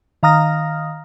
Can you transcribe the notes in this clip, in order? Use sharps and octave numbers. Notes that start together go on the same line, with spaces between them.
D#3 F5 A#5 D#6 F6 A#6